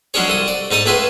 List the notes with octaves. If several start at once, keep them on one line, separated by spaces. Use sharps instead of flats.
F#3 G#3 C#4 D4 G#4 C#5
C2 A4 D#6
D5
G#2 D#4 A4 A5 D#6
C#2 A3 G#4 B4 E5 C6